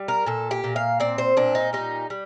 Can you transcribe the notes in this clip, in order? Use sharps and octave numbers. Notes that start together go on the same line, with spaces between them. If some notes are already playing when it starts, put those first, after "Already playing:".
Already playing: G3
A#4
A#2 A4
G4
A#2
F5
C4 D5
C5
A#2 D4
D#4
G3 D#4
G3